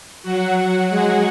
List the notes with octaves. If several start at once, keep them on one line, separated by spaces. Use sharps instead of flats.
F#3 F#4
F#3 F#4
G#3 G#4